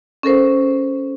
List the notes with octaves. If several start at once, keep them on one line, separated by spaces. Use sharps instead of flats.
C#4 A4 A#4 C5